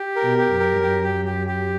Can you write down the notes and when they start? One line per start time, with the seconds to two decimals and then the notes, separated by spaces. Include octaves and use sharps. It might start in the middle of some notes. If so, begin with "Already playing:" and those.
Already playing: G4
0.16 A#4
0.23 B2
0.38 G4
0.53 F#2
0.60 A#4
0.81 G4
1.03 G4
1.25 G4
1.47 G4